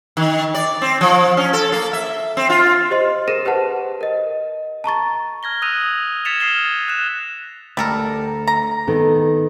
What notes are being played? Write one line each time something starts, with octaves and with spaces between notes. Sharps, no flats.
D#3
D5
C4
F3
C#4
A4
A#3
E5
C4
F4
G4 C5 D#5 C6
G#4 A#4 A#6 D#7 E7
G4 B4 C5 F#5 A5
A#4 D#5
A5 A#5 C#6 A6
F6 G#6 A#6 G7
D#6 E6 F#6 A#6 D#7 F7
G#6 A6 B6 C#7 E7 F7
D#6 F6 C7 E7 G7
A6
F#6 E7
D2 G3 A4 A#4
A#5
D#3 B3 A4